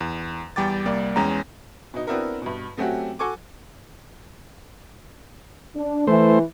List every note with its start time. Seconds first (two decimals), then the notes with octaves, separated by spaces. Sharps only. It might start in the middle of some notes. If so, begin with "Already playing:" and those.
0.01 E2
0.56 E2 G3 G5 D6 A6
0.86 C2 G3 A#3 D5
1.16 E2 G#3 C#4 G5 A#5
1.94 B2 D#4
2.07 B3 C4 D4 E4 F#4 A#4
2.42 G2 B2
2.77 F#3 A3 C4 C#4 F#4 G4
3.19 F#4 A4 G#5 C#6 D6
5.76 D4
6.07 E3 A3 C5